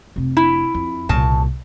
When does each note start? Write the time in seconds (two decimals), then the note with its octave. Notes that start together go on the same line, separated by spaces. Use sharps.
0.16 F1 C3
0.37 E4
0.74 F2
1.09 C2 A#2 C#3 A5